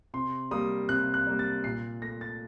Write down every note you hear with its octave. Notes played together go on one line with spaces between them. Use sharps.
C3 C6
G3 A#3 D#6
C3 F#6
F#6
G3 A#3
A6
A#2 C7
A3 A#6
A6